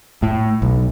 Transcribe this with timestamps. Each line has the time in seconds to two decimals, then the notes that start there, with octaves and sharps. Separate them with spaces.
0.23 A2
0.62 B1